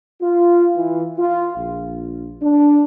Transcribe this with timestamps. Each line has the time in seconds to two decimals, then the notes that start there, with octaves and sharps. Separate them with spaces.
0.21 F4
0.76 E3
1.18 F4
1.56 A#1
2.42 D4